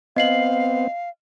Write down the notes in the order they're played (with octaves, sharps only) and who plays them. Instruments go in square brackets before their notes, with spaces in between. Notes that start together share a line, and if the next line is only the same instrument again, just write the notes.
[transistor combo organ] B3 C4 [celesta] D#5 C7 F#7 [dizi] F5